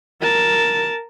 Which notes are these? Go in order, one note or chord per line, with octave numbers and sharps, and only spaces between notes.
A#4 A5